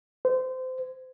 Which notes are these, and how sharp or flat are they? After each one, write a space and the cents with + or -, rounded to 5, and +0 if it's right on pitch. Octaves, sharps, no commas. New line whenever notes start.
C5 -25